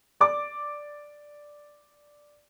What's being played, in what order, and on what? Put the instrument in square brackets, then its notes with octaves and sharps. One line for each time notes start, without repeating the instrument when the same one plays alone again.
[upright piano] D5 D6